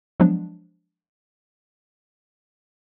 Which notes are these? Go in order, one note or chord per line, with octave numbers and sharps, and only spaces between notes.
F3 F#3 G#3 B3 D4